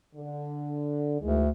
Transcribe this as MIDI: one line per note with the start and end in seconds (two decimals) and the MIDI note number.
0.15 1.20 50
1.21 1.49 38
1.21 1.44 51
1.21 1.44 52
1.21 1.44 56